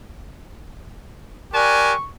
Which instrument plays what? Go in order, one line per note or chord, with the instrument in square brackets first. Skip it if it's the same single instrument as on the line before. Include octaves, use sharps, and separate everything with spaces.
[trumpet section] G4 G#5 [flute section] A#4 D5 F#6 [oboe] C#6